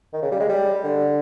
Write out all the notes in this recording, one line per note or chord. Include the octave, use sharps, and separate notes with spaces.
D#3
C#3
G3
G#3
G3
D3